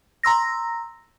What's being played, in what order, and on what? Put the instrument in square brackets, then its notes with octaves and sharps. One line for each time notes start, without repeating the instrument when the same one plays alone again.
[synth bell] A#5 C6 E6 A#6